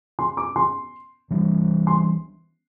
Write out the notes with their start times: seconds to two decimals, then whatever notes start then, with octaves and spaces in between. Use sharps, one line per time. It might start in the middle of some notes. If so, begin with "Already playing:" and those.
0.19 C6
0.37 D6
0.56 C6
1.31 E3 G3 D4
1.87 C6